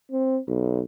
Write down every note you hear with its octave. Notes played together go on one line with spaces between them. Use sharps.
C4
B1